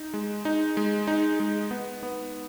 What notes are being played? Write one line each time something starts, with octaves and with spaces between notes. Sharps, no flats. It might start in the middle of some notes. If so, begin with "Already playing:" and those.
Already playing: D#4
G#3
D#4
G#3
D#4
G#3
B3
B3